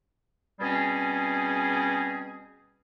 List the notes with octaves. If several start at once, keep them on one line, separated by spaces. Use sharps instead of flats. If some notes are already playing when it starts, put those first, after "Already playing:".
B2 G3 C4 C#4 G#4